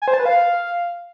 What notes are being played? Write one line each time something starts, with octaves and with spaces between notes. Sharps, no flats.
G#5
C5
A5
B4
F5